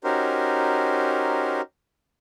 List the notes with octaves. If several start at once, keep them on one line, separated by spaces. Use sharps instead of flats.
C#4 D#4 F#4 G4 A#4 C5